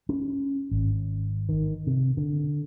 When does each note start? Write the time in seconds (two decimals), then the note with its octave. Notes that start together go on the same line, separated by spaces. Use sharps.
0.09 C#4
0.71 G#1
1.49 D#3
1.87 C3
2.17 D3